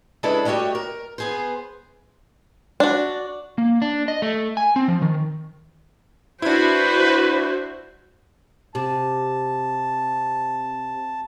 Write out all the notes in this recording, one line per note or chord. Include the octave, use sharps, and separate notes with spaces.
C#3 G#3 D4 E4 A4 B4
G3 A3 F#4 G4 C#5 D#5
A#4
B3 G#4 C5
D4 F#4
A#3
D4
D#5
A3
G#5
C4
F3
D#3
D4 E4 F#4 B4 C5
C3 A5